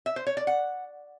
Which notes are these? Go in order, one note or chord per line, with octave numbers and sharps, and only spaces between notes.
E5
C5
C#5
D5
F#5